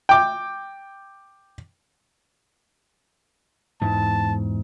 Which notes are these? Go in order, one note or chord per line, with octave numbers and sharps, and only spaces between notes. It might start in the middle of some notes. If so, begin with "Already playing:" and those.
G5 D6
E2 G#2 A5